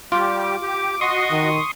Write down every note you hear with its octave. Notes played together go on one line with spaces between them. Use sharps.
G3 F4 G4 D6
G4
F#4 D#5 C6 C#6 D#6
D#3